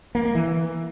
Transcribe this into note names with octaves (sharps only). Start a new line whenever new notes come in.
A#3
A#3
E3